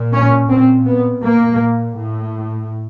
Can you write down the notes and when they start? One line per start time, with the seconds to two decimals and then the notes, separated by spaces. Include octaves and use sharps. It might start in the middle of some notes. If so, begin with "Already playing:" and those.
Already playing: A#2
0.13 C#4
0.49 A#2 C4
0.86 B3
1.23 A#2 A#3
1.97 A2